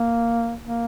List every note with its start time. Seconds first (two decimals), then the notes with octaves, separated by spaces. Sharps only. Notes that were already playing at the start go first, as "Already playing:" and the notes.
Already playing: A#3
0.64 A#3